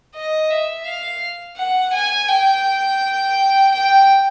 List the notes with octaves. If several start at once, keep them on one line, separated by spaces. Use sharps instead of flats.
D#5
E5
F5
F#5
G#5
G5
G5